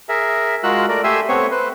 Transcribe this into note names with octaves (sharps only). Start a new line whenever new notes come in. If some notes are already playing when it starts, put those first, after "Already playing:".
G#4 A#4 E5
G#3 F4 F#4 A#4 E6 F#6
A3 A#4 D5
A3 G4 E5 G#5 C6 E6
A3 B3 C4 C5 C#5 C#6
B4 C5